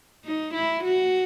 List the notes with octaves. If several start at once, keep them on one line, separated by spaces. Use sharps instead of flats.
D#4
E4
F#4